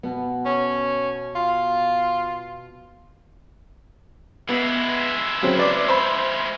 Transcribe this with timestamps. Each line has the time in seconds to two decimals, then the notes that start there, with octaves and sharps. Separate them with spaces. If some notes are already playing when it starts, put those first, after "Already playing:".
0.03 B2 B3
0.46 C#4
1.35 F4
4.49 G#3 B3 E4
5.42 C#3 F#3 C4
5.57 B4 D5 D6
5.88 C5 B5